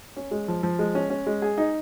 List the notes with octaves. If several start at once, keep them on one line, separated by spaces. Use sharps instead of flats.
C#4
G#3
F3
F3
G#3
C#4
C#4
G#3
G#4
D#4